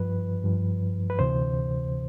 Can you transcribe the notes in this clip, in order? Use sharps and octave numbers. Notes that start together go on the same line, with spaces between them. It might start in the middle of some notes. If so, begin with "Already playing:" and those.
Already playing: G2 F3 B4
G2 F3
B4
D2 C3 E3 C5